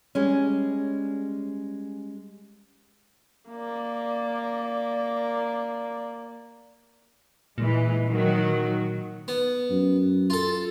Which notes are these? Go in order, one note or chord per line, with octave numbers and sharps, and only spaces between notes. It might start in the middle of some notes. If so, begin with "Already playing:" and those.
G3 G#3 C#4
A#3 D5
A#2 E3 G#3
D#3 F#3 F#4
B3
F#2
F4 A4